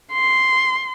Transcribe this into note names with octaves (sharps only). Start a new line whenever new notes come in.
C6